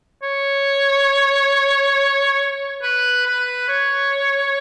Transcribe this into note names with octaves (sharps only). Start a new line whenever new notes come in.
C#5
B4
B4
C#5